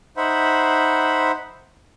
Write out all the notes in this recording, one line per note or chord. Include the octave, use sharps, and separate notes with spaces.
D#4 C5 E5 F#5 B5